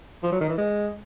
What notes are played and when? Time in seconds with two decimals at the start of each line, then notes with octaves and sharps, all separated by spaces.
0.23 F3
0.32 F#3
0.40 D#3
0.49 E3
0.58 G#3